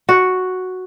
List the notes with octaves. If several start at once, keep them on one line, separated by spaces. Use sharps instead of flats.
F#4